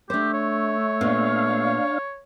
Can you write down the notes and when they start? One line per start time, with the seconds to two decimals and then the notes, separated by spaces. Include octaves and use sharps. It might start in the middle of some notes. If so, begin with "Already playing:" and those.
0.10 A3 D4 G4 C5
0.34 C#5
1.01 A#2 B3 D4 F5